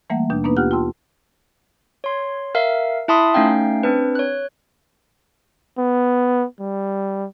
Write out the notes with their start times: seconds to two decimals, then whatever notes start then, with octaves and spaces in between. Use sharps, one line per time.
0.10 E3 G3 A3 A#3 E5 F#5
0.30 D#2 B2 D4 G6
0.44 A#3 B3 D4 D#4 B4
0.57 D#2 F4 G4 F#5 F6 F#6
0.71 F4 G5 A5 C6 E6
2.04 C#5 C6
2.55 A#4 E5 F5
3.08 E4 E5 A5 B5 C6 D#6
3.34 A3 C#4 D#4 F5 G5
3.83 C4 D4 B4
4.15 C#5 F#6
5.78 B3
6.60 G3